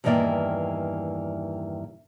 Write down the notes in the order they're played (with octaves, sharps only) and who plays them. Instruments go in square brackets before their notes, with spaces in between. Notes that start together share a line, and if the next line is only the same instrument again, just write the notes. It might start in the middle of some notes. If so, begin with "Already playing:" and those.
[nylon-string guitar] E2 G2 D#3 E3 A#3 D5